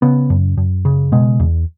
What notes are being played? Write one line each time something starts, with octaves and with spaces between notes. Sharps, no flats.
C#3 B3
F#2
F#2
C#3
B2 G#3
E2